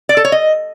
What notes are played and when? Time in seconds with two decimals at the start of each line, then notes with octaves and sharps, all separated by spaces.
0.09 D5
0.17 A4
0.25 C#5
0.32 D#5